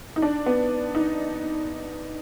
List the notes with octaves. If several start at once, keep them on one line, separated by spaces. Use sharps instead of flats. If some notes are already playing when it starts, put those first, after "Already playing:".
D#4
D4
B3
D#4